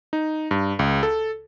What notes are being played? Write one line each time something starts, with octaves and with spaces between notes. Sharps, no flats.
D#4
G2
C#2
A4